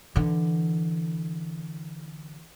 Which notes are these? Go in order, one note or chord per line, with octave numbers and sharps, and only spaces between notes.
D3 E3